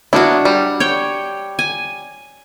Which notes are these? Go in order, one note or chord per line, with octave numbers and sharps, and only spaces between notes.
A#3 B3 D4 E4 F#4
G3
C#5 G5
G#5